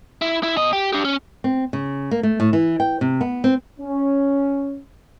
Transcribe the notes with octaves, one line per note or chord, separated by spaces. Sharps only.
E4
E4
B2 D#5
G4
D4 G4
C#4
C4
C#3
A#3
A3
A2
E3
G5
C3
B3
C4
C#4